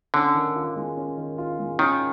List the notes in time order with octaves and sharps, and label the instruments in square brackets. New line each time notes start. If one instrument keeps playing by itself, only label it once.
[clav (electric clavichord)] D3 [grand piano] C#4
[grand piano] D#3
F4
G#3
C#4
D#3
F4
G#3
[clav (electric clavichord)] D#3 [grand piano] C#4